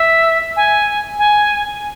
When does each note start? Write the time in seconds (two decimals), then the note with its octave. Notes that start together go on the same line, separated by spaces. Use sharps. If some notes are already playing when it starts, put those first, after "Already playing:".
Already playing: E5
0.56 G#5
1.19 G#5